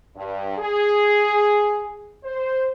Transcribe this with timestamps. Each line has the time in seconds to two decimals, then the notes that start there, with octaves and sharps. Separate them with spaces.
0.15 G2
0.58 G#4
2.24 C5